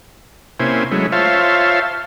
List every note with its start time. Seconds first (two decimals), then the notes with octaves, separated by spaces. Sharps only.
0.60 C3 A#3 C#4 E4 C5 G#5
0.92 F#3 G#3 A3 C#4 E4
1.12 F4 C5 C#5 E5 F5 A5